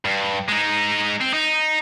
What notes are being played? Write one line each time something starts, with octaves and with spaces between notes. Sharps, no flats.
G2
G#3 D#4
C4
D#4